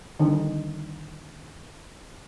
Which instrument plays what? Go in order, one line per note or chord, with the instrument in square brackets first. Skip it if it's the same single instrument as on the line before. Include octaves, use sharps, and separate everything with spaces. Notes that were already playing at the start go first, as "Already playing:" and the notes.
[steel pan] D3 D#3 G3 C4 D4 D#4